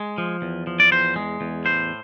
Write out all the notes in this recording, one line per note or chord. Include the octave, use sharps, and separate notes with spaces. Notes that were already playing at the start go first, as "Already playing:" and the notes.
Already playing: G#3
F3
E2
F3
D5
E2 C5
G#3
E2
A2 C5